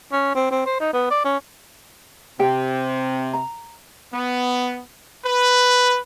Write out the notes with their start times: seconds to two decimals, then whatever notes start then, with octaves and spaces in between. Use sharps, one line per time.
0.13 C#4
0.35 C4
0.51 C4
0.66 C5
0.80 D#4
0.94 B3
1.11 D5
1.25 C#4
2.39 C3 G4 G5
3.33 A#5
4.14 B3
5.25 B4